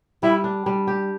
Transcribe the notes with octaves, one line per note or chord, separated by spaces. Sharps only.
G3 E4
D4
G3
G4